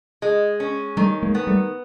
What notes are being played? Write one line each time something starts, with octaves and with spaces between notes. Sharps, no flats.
G#3
C#4
D#3 G3 A3
G#3 A#3
B3
G3 A3